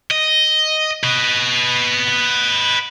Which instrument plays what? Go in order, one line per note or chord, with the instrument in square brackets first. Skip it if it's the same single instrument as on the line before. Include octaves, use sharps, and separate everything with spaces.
[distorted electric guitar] D#5
B4 D#5